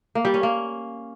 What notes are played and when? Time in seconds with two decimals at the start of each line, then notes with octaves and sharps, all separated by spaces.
0.15 A#3
0.25 G3
0.34 C#4
0.43 A#3